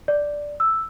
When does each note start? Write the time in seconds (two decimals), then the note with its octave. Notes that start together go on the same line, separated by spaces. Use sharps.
0.08 D5
0.60 E6